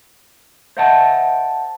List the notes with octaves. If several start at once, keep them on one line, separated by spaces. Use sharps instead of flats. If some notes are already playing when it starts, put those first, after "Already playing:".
C5 D#5 E5 F#5 G5 A5